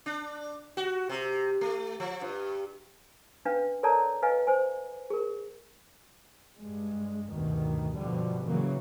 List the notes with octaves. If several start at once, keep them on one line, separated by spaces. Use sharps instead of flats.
D4
F#4
C3
A3
F3
G2
C#4 D4 B4 F5
A4 A#4 C#5 D5 A5 A#5
B4 D#5 F5 G#5
C5 G#5
G#4 A#4
G2 G#3
D2 G2 B2 D#3
G2 B2 D3 F3 G3
A#2 C#3 E3 F#3 A#3